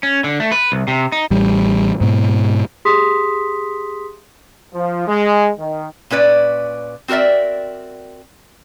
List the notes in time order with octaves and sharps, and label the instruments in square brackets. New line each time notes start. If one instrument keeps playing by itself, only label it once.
[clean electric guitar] C#4
D3
A3
B4
C2
C3
D#4
[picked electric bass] A1 G3
G#2 B2
[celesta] G4 G#4 C6 D#6 B6
[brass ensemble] F3
G#3
D#3
[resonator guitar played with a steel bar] A#2 C#4 B4 D5
C4 F#4 A#4 D5 E5